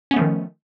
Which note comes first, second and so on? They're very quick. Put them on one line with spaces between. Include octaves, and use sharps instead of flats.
C#4 B3 A3 F3 D#3